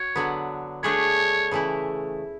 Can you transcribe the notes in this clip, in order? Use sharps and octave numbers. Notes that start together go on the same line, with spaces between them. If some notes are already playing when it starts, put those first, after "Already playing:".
Already playing: F#4 C#5
D3 F#3 B3
A3 D4 G#4 B4 C#5
C#3 E3 A3 E4